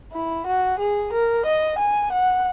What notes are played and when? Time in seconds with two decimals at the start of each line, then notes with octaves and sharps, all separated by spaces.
0.13 E4
0.47 F#4
0.79 G#4
1.12 A#4
1.46 D#5
1.79 G#5
2.12 F#5